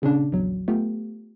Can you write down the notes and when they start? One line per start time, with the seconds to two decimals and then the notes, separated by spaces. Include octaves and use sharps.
0.02 A#2 C#3 C#4 D4
0.32 A#1 E2 F#3
0.68 A3 B3 F4 G4